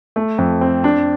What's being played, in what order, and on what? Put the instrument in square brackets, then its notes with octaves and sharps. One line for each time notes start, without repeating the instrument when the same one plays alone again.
[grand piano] A3
F2
C4
D4